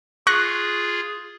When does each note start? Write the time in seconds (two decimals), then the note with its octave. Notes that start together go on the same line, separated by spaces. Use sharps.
0.27 F4 G#4 C#6 F#6 A#6